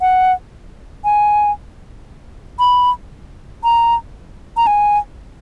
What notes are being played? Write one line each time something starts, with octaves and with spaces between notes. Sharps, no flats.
F#5
G#5
B5
A#5
A#5
G#5